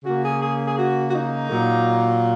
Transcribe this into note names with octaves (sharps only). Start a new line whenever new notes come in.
C#3 A#3 F#4
G#4
G#4
G#4
F#4
F#4
D#4
A#2 F#3 A#3